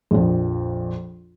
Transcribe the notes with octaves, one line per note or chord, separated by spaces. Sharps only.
A#1 F2